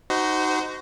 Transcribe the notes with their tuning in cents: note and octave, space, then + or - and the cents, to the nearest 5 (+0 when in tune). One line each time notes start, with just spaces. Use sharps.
D#4 +0 F#4 +15 C5 -25